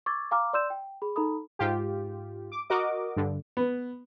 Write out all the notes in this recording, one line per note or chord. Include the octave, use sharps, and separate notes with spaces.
C#6 D6 E6 G#6 A6
F5 G#5 A#5 D6 F6
D5 C6 E6 G6 E7
G5
G#4 B5
D#4 A4 A#5 B5 D#6
G#2 F4 G4
D6
F#4 A#4 D#5 D6
G2 D3
B3